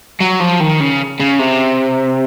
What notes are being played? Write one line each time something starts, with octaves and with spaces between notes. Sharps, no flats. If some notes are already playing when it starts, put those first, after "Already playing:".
F#3
F3
D#3
C#3
C#3
C3